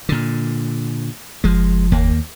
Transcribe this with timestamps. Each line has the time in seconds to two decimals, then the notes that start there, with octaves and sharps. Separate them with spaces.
0.09 A#2 D3
1.44 F#1 F3 G#3
1.92 D#2 A#3